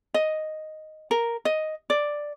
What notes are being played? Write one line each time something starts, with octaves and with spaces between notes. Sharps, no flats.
D#5
A#4
D#5
D5